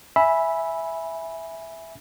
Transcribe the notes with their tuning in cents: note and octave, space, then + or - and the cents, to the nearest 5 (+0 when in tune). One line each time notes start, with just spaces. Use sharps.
E5 +0 G#5 +0 B5 -10